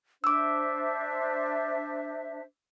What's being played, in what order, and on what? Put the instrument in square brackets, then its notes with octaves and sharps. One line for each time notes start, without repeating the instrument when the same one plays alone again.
[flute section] D4 C5 E5 [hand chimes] D6 E6